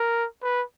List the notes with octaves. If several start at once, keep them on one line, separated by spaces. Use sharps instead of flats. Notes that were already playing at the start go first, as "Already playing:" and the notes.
Already playing: A#4
B4